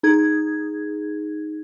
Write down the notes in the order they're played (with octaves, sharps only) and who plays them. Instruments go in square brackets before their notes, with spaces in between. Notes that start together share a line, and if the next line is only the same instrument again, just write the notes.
[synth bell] D#4 G#4 G#6